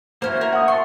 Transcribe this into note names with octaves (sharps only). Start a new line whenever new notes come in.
E3 A#3 C#4 F#4 C5 F6
A#4
F#5 D#6
A5 C6 C#6